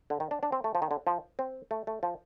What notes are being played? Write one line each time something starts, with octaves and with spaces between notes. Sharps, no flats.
D3
D#3
D4
D4
C4
A3
F3
D#3
D3
F3
C4
A3
A3
F3